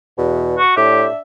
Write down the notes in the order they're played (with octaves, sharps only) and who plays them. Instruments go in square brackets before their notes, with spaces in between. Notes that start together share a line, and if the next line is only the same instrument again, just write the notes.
[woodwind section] E2 [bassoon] B2
[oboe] F#4
[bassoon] A2 [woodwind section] D4 D5 E5 [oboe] G4